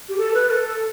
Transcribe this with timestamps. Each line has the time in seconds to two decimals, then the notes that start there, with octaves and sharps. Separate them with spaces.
0.09 G4
0.18 A4
0.34 B4
0.50 A4